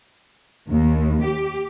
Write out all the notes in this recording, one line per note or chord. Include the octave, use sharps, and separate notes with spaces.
D#2
G4